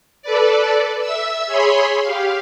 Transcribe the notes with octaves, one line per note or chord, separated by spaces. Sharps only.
A4 B4 D5
E5 E6
G#4 C#5 B5 C6
G4 F5